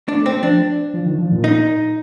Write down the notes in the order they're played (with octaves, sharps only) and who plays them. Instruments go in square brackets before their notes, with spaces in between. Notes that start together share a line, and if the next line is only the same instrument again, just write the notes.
[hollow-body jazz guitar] D4
[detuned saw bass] A3
[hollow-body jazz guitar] C4
[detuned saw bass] F3 [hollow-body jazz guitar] D4
[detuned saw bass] F3
D#3
F3
A#2
[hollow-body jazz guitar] D#4